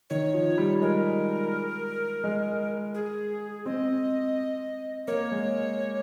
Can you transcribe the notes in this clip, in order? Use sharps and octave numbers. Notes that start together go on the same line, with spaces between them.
D#3 C#5
F3
G3
G#3 A#4
G#3
G#4
C4 D#5
A#3 C#5
G#3